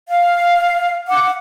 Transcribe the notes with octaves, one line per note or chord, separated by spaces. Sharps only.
F5
F#5 D6